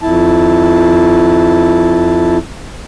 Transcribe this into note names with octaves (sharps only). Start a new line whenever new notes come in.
F2 E4 A5